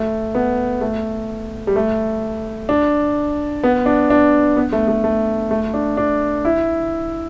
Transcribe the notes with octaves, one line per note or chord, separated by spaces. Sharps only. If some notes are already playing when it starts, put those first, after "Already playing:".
Already playing: A3
B3
A3
G3
A3
D4
B3
D4
D4
B3
A3
A3
A3
A3
D4
D4
E4